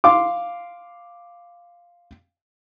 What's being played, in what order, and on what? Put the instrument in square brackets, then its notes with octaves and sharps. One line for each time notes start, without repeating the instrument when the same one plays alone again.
[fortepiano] F5 C6 D6